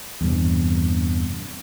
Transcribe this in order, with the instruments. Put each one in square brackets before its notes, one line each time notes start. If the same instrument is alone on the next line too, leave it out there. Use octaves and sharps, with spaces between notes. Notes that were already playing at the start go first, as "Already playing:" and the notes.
[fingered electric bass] E2 G2 C3